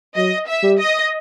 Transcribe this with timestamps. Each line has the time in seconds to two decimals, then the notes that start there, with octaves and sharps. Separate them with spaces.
0.16 F#3 D#5
0.47 E5
0.63 G3
0.79 D#5